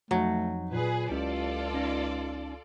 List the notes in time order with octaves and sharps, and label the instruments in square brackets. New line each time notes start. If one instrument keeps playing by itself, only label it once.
[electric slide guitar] F2 D#4 [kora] F#3 [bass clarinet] A3
[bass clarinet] A#2 [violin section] G#4 B4
[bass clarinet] C#2 [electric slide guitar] C#4 E4 G4 [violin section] F4 A4 D5
[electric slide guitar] C#4 D#4